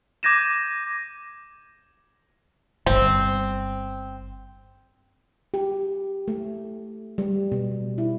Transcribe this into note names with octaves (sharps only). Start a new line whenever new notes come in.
D6 G6 G#6 A#6 D#7 E7
D1 G1 C4
G4
A3
G3
B2
E4